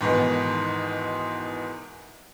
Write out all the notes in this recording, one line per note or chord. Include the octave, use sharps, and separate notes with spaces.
E2 G#2 B2 D#3 B3